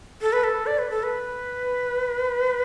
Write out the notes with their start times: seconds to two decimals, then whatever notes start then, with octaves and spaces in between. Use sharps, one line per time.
0.21 A4
0.33 B4
0.44 A4
0.66 D5
0.78 B4
0.90 A4
1.03 B4